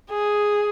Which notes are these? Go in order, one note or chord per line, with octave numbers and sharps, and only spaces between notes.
G#4